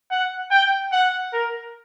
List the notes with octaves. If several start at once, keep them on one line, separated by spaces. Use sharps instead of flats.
F#5
G5
F#5
A#4